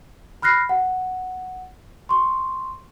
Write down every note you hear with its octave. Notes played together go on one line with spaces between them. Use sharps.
B5 F6 F#6 A#6 C7
F#5
C6 C#6